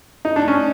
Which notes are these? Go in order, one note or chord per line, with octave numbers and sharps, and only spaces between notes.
D#4
D4
C#4